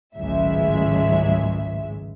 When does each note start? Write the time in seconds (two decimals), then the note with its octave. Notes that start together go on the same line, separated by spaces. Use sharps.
0.17 G#1 C#2 A2 F#3 G#3 E5